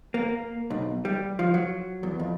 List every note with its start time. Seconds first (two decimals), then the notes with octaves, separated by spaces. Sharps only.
0.14 A#3
0.70 B1
1.05 G3
1.39 F3
1.54 F#3
2.03 E2
2.19 F2